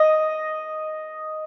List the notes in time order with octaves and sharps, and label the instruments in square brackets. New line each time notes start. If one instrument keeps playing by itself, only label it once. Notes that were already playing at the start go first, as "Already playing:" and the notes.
Already playing: [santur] D#5